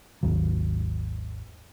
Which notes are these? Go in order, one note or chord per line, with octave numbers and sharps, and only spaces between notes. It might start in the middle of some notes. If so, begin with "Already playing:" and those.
G#1 D#2 F#3